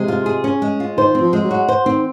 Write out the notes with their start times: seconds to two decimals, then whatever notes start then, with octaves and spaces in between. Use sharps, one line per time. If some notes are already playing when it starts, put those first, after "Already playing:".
Already playing: C3 G#3
0.08 F4
0.26 G#4
0.44 C#4
0.62 G#3
0.80 F4
0.97 D#3 C5
1.15 C4
1.21 F3
1.33 G#3
1.44 F#3
1.51 F#4
1.68 C5
1.86 D#3 C4